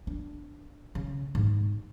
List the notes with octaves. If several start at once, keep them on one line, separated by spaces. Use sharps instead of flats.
D4
C#3
G#2